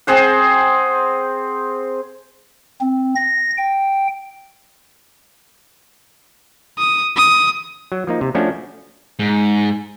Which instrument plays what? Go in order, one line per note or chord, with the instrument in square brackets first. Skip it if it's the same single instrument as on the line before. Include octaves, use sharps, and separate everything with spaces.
[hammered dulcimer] C4 G#4 C5 F#5
[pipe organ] C4
A#6
G5
[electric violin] D#6
D#6
[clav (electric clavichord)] F#3
F3 A#3 D#4
C3
F3 A3 C#4 D4 F#4 A4
[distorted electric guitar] G#2